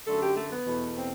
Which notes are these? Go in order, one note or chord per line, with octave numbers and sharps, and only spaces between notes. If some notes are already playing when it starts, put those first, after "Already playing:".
F#2 D3 F#3 A3 A4
G4
A3
B3
E2 B2 A3
C4